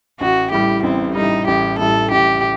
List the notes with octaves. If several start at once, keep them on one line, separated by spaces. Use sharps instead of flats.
A1 F#4
A2 G3 G4
A1 C4
A2 G3 D#4
A1 G4
A2 G3 A4
A1 G4